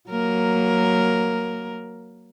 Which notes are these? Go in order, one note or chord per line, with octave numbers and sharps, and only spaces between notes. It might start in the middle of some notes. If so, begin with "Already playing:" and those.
F#3 A#3 A#4